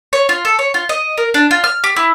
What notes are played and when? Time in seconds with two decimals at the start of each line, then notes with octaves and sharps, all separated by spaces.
0.13 C#5
0.29 F4
0.45 A4
0.59 C#5
0.74 F4
0.89 D#5
1.17 A#4
1.34 D4
1.51 F4
1.64 F6
1.84 G4
1.96 E4